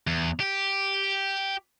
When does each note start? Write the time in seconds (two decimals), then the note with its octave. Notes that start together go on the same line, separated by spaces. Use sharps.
0.07 E2
0.40 G4